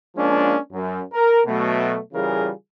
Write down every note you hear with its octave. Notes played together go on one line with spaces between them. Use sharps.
F3 G#3 A#3 C#4 D4
F#2
A#4
B2 F#3 A3
C#3 E3 G3 F4 G#4 A#4